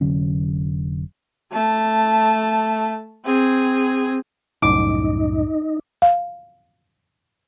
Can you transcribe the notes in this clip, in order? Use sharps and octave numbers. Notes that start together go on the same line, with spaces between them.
F1 D3 F#3 C#4
A3 A5
C4 G#4
C2 F#2 A2 D#4 D6
F5